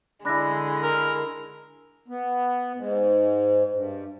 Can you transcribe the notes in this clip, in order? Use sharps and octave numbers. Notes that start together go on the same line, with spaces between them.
D3 G#3 D4 E4 B5 F#6 A#6
A#4
B3
G#2
G2